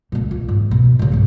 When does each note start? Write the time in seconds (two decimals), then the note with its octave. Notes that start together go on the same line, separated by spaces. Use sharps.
0.12 C#2 A#2
0.31 F4
0.48 G#2
0.71 B2
0.99 A2 C#3
1.12 B1 G2